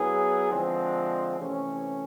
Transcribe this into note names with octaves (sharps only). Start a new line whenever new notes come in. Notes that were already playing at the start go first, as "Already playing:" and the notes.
Already playing: F#3 B3 E4 G#4
D3 F3 G#3 C4
C3 E3 A3 C#4